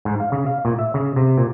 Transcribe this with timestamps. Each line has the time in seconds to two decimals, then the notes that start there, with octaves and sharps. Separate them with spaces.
0.05 G#2
0.20 F5
0.32 C#3
0.46 F5
0.65 A#2
0.79 E5
0.94 C#3
1.16 C3
1.38 A#2